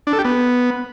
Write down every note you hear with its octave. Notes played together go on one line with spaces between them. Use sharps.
D4
A4
G4
B3